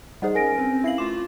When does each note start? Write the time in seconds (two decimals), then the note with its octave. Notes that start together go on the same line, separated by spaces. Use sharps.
0.22 G3 D#4 G#4 C5 D#5 F#5
0.35 C#4 A#4 G#5 A#6 D7
0.58 C4 C#4 B4
0.84 E4 E5 F5 C7 F#7
0.98 A3 F4 D6 E7